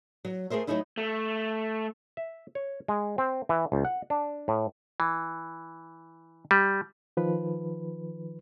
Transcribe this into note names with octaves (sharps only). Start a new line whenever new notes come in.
F#3
A3 G#4 A#4 C5 E5
F#3 G#3 A3 D#4 E4 E5
A3
E5
C#5
G#3
C4
E3
C#2
F#5
D4
A2
E3
G3
D#3 F3 B4